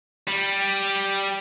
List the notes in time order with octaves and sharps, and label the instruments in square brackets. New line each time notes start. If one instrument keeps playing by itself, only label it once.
[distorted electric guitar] G3